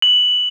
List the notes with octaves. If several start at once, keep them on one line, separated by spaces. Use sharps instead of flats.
F#7